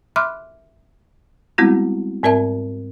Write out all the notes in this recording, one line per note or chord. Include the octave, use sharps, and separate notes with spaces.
E5 B5 C6 D6 F6 F#6
G3 G#3 B3 C4 E4 F#4
G#2 C4 A#4 D5 E5 A5